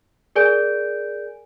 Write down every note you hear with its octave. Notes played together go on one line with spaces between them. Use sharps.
G#4 A#4 D5 G#5 G6 D7